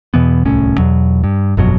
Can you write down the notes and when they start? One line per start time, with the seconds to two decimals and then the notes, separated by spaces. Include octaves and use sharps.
0.14 E2 B2 E3 B3
0.45 D1 C2 A2 C#4
0.78 E2 B2 F#3
1.24 G2
1.57 G1 F2 B2 F#3